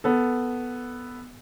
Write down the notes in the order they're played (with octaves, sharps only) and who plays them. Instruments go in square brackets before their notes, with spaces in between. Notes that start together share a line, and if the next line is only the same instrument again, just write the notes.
[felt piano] B3 A4